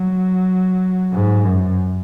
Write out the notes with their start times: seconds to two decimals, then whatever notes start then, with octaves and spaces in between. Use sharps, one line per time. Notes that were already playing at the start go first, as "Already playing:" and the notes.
Already playing: F#3
1.13 G#2
1.44 F#2